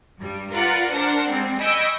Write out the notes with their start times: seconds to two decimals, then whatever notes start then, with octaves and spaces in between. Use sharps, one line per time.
0.18 G2 G3
0.51 F4 A#4 B4 D5 F#5
0.91 D4 A#4 C5 F#5 A5
1.27 G3 G#3 C4
1.59 D#5 G5 G#5 B5 C#6 E6